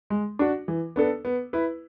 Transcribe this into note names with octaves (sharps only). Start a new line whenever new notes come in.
G#3
D4 F#4
E3
B3 D4 A4
B3
E4 B4